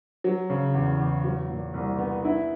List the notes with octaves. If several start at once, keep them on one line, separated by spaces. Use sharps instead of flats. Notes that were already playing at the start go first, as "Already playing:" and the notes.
F#3
C#3
E2
E2
F#3
A#2
C2
B3
E4